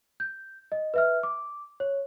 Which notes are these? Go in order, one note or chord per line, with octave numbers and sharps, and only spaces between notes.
G6
D#5
B4 E5 F6
D6
C#5